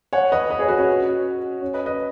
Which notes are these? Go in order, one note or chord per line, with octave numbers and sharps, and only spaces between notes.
C#5 F#5
B4 D#5
B4 D#5
G#4 C#5
F#4 B4
C#4 F#4
C#4
B4 D#5
B4 D#5